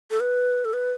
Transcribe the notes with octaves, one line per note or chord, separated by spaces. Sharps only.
A4
B4
A4
B4